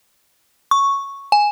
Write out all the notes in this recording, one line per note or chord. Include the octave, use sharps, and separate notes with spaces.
C#6
G#5